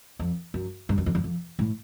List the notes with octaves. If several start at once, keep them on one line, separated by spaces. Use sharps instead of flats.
F2
F#2
G2
F#2
F2
E2
F2
A2